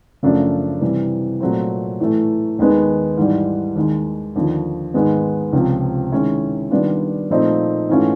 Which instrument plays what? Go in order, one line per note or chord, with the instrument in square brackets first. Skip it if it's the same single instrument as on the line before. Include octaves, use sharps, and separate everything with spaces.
[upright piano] F#2 C#3 F3 A3 D4
C3 E3 G3
A#2 F#3 A3 C4
A2 E3 A3
D#2 D#3 G#3 B3
G#2 E3 G3
D#2 D#3 G#3
D#2 D3 F3
G#2 D#3 G#3 B3
C#2 C3 F3
D#3 G#3 C#4 E4
D#3 G3 B3 D4 F4
A#2 F3 A3 C4 D#4
G#2 E3 A3 C#4 F4